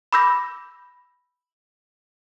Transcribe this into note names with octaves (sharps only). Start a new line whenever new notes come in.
B5 D6 E6 G6 A#6